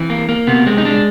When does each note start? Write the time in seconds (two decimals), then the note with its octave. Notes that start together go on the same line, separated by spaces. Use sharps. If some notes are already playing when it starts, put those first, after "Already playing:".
Already playing: E3 C4
0.10 A#3
0.29 A#3
0.47 C3 B3
0.66 G#3 C4
0.78 D#4
0.85 G#3 D4